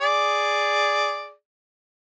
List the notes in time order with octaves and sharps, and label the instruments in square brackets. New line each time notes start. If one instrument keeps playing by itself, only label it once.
[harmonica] G#4 D5